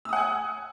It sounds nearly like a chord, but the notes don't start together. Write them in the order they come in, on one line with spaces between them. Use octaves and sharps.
E6 D#6 F#5 G#5